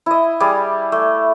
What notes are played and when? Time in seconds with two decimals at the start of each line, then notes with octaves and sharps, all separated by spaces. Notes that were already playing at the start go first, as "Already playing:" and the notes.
0.06 E4 D#5
0.40 G3 G#4 D5
0.92 A3